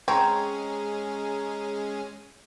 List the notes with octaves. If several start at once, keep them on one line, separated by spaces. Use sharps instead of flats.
G#3 C4 C#4 G#4 A#5 C#6 G#6